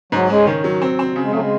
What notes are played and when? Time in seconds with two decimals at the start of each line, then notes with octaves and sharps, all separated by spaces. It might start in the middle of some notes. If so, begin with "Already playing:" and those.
0.12 G#2 F#3
0.30 G#3 C#4
0.47 D#3
0.64 F#3
0.82 C4
0.99 C4
1.16 C#3
1.24 G#3
1.33 C#3 F#3 A3
1.42 G#3